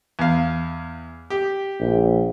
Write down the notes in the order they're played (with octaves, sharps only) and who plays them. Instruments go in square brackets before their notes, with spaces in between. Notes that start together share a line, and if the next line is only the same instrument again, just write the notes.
[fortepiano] E2 F5
G4
[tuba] A#1